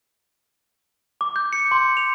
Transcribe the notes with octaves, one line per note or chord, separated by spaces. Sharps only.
D6
G6
C#7
C6
F7